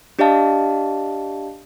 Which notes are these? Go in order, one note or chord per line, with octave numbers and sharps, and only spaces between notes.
D4 G4 D5 D#5 F5 A5